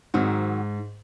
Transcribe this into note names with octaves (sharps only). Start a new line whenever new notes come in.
G#2 D#3 F#3 C4 F#4